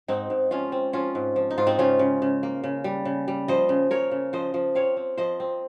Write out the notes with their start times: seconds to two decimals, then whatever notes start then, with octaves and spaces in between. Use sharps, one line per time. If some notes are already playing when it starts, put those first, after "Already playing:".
0.08 G#2 C4 D#4
0.30 G#2
0.51 F3 C#4 F4
0.72 C4
0.93 F3 C#4 F4
1.15 G#2
1.36 F3
1.50 D#4
1.58 G#2 F4
1.67 C4 D#4
1.79 C#3 C#4 F4
1.99 C#3
2.22 C#3
2.43 A#3
2.63 C#3
2.84 G3
3.05 C#3
3.28 G3
3.48 F3 C5 D#5
3.69 C#3
3.90 C#3 A#4 C#5
4.11 C#3
4.33 F3 C5 D#5
4.54 F3
4.75 C4 C#5 F5
4.97 C4
5.17 F3 C5 D#5
5.40 C4